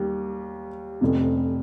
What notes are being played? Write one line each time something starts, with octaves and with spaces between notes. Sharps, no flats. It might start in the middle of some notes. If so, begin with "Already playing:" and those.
Already playing: D#2 G3
F1 F2 C3